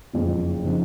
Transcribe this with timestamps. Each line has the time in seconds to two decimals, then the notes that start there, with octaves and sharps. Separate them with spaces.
0.13 F#1 F2 C#3 F3
0.64 C#3 F3 C4 D#4